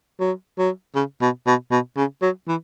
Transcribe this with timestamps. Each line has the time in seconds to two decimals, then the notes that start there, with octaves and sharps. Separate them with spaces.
0.20 F#3
0.58 F#3
0.96 C#3
1.22 B2
1.47 B2
1.71 B2
1.97 C#3
2.22 F#3
2.48 E3